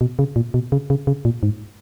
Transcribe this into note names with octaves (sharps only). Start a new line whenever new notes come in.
B2
C#3
A#2
B2
C#3
C#3
C#3
A#2
G#2